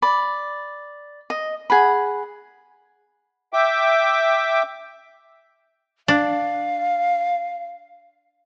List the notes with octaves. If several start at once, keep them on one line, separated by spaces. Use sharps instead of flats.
D5 B5
D#5
G#4 F#5 B5
E5 G5 D6
D4 F5